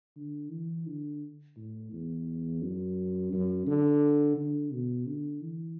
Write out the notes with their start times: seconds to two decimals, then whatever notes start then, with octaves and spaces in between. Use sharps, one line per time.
0.17 D3
0.51 E3
0.87 D3
1.57 A2
1.92 E2
2.63 F#2
3.33 F#2
3.67 D3
4.37 D3
4.72 B2
5.07 D3
5.42 E3